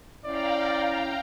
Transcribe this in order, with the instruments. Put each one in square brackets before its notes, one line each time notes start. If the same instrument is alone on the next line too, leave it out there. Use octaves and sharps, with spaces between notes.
[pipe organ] C#4 E4 [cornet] D5 [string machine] F5 G5 A#5